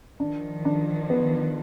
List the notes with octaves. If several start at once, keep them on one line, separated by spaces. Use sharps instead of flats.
D#3 F3 D4
D4
B3